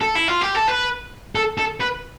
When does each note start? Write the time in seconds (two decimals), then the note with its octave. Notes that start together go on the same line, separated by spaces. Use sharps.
0.01 A4
0.15 E4
0.28 F4
0.41 G4
0.55 A4
0.68 B4
1.35 A4
1.58 A4
1.80 B4